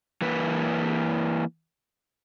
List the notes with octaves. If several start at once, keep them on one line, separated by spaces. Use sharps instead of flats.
E3 A#3 B4